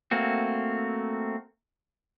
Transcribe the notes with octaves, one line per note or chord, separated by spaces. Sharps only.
A3 A#3 C4 F#4